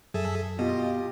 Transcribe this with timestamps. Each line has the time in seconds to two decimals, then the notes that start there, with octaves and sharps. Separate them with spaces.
0.14 F#2 G#4 A4 E5
0.59 B2 F4 G4 D#5